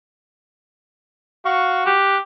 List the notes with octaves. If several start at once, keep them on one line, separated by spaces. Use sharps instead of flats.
F#4 F5 C#6
G4 F#6